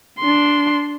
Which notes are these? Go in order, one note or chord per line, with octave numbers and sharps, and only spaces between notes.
D4 C6